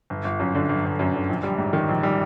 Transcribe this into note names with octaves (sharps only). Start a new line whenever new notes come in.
G1
G1
F#2
D3
G1
G1
F#2
D3
A#1
G3
G#2
D#3
A#1
G3